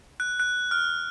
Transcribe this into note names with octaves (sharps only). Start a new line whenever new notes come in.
F#6
F#6
F6